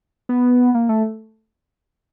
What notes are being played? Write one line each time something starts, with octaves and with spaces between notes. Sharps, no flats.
B3
A#3
A3